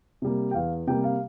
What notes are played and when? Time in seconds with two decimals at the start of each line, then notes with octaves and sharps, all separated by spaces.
0.22 C3 G3 A#3
0.51 G5
0.54 E2 F5
0.87 C3 G3 A#3 G5
1.04 F5